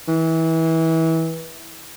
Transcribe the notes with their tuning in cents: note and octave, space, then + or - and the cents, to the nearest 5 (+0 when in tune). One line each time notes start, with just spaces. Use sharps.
E3 -25